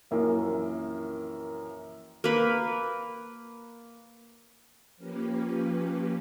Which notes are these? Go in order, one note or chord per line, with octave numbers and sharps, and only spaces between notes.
A#1 F#2 E3 A#3
A#3 B4
F3 A#3 C#4 G4 B4